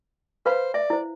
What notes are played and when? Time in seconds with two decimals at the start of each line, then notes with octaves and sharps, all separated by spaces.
0.46 B4 C5 F5 B5
0.74 D5 E5
0.90 E4 C5